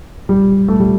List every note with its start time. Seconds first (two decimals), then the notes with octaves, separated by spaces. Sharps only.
0.29 G3
0.68 A3
0.80 G3